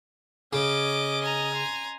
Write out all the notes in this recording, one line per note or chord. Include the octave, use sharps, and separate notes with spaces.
C#3 C#4 D#5 D6
G#5 A#5
C6